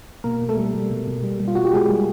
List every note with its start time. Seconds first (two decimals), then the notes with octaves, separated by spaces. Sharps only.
0.24 B2 A#3 A#4
0.42 B2
0.49 A3 A4
0.57 G3
0.75 G3
0.91 B2
1.07 B2
1.23 G3
1.40 G3
1.48 F4
1.55 B2 F#4
1.65 G4
1.74 B2 G#3 G#4
1.90 G3